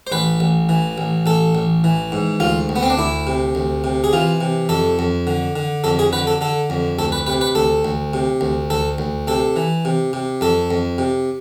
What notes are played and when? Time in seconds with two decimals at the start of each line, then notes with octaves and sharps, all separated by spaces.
0.07 C5
0.12 A1 B4
0.40 A1
0.69 E3
0.98 A1
1.26 A1 A4
1.55 A1
1.84 E3
2.12 G#2
2.40 D2 F4
2.69 D2
2.76 B3
2.83 C4
2.90 D4
2.98 D2 E4
3.27 C3
3.55 D2
3.84 C3
4.04 G#4
4.13 E3 F4
4.41 C3
4.69 F2 A4
4.99 F2
5.27 D3
5.56 D3
5.84 F2 A4
5.99 G#4
6.13 D3 B4
6.27 A4
6.41 D3 A4
6.70 F2
6.99 D2 A4
7.12 B4
7.27 C3 B4
7.41 B4
7.55 D2 A4
7.85 D2
8.13 C3
8.41 D2
8.70 D2 A4
8.98 D2
9.28 C3 A4
9.56 E3
9.85 C3
10.13 C3
10.41 F2 A4
10.71 F2
10.98 C3